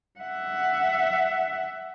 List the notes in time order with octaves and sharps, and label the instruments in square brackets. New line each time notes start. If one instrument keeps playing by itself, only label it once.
[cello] E5 F#5